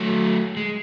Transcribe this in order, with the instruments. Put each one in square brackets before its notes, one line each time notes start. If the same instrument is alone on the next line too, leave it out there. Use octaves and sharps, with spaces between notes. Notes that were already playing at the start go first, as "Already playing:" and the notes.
Already playing: [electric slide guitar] F#3 A3
G#3